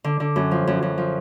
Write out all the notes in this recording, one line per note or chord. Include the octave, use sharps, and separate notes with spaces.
D3
D3
F#2
F3
F#2
F#2
F3